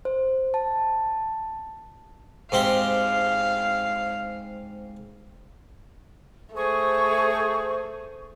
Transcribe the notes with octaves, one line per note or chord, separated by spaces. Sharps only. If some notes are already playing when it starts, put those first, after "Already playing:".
C5
A5
G#2 C4 G4 F5
A3 G#4 C5 C#6